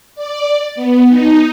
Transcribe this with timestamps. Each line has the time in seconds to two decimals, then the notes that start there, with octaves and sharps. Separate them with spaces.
0.15 D5
0.75 B3
1.09 D#4